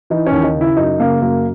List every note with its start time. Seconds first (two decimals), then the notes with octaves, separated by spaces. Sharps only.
0.10 E3 D#4
0.27 C#4
0.32 D#2
0.44 D#4
0.55 C#3
0.61 E4
0.77 F#2 D#4
0.99 C#3 A#3
1.21 F#2 A#3